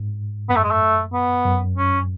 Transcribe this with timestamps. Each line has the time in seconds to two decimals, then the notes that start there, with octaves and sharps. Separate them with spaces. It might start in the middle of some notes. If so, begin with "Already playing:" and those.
Already playing: G#2
0.49 F#2 B3
0.56 A3
0.64 G#3
0.71 A3
1.14 B3
1.46 F#2
1.77 C#4